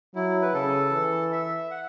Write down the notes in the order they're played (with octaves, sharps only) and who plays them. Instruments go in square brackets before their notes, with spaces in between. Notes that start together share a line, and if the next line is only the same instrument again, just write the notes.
[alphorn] F#3 [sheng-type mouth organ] E4
[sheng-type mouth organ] B4
[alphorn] C#3 [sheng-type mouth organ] A4
[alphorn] E3
[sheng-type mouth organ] E5
F#5